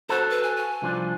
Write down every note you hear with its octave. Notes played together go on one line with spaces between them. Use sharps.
F#4 A4 C5
B4
G#5
G#5
C2 F3 D4